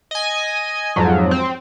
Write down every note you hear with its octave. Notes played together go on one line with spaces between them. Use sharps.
D#5 G#5
F2 G#2 F3 F#3
C4